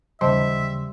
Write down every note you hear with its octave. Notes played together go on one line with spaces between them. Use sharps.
D#2 C#3 G3 C5 D#5 E5 A5 C6